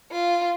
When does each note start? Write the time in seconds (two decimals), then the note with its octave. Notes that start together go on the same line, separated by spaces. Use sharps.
0.11 F4